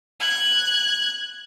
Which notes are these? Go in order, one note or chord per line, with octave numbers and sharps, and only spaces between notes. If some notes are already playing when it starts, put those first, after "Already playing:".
F#6 G#6